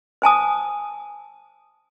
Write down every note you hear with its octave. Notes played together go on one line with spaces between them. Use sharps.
C5 G#5 A5 D#6